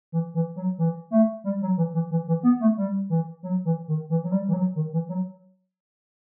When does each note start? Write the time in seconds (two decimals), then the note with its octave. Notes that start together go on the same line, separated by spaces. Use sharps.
0.12 E3
0.34 E3
0.56 F#3
0.78 E3
1.11 A3
1.44 G3
1.61 F#3
1.77 E3
1.94 E3
2.11 E3
2.27 E3
2.43 B3
2.60 A3
2.77 G3
3.09 E3
3.43 F#3
3.65 E3
3.88 D#3
4.10 E3
4.24 F#3
4.32 G3
4.48 E3
4.53 F#3
4.75 D#3
4.93 E3
5.09 F#3